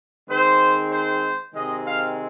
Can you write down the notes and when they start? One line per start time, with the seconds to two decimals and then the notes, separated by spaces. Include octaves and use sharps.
0.29 D#3 G#3 C4 C5
0.91 C5
1.54 C3 D#3 G#3 C4 D#5
1.85 F5